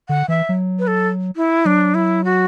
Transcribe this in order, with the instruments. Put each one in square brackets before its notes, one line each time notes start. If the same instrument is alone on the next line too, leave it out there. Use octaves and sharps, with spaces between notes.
[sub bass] D3 [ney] F#5
[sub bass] E3 [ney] E5
[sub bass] F#3
[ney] B4
A4
E4
[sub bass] F#3 [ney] D4
[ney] E4
F#4